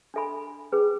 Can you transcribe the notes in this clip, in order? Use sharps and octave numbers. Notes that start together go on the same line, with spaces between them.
D4 A4 E5 G#5 B5
C#4 G#4 B4